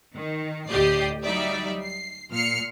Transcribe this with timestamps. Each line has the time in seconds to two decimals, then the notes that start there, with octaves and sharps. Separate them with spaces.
0.15 D#3
0.69 D2 A2 G4 D5 D#5 C7
1.22 F#3 G3 D#4 D5 E5
1.83 C7
2.32 A#2 F6 C7 C#7